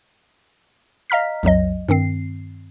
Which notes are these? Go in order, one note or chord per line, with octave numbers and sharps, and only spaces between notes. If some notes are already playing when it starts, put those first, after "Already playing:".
D#5 F5 A#5 F6 B6
B1 F2 F#3 D#5
G2 D#3 C4 C7